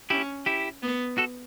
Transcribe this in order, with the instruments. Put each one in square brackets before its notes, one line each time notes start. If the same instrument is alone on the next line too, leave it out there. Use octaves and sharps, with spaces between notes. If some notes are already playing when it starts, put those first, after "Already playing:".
[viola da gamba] C#4 [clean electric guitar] E4 G4
[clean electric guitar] E4 G4
[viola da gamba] B3
[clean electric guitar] F#4 A4